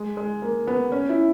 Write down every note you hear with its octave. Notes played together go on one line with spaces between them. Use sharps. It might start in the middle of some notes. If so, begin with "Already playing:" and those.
Already playing: G#3
G#3
A#3
B3
C#4
E4